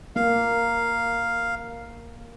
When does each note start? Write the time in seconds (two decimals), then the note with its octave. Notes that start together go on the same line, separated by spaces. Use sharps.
0.16 A#3 F5